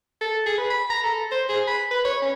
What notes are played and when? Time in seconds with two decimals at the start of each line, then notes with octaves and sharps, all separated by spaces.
0.21 A4
0.46 G#4
0.58 B4
0.70 B5
0.90 A#5
1.04 A4
1.32 C5
1.49 G#4
1.68 B5
1.91 B4
2.05 C#5
2.22 C#4